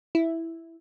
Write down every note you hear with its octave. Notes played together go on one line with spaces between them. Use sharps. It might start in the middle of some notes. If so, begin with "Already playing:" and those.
E4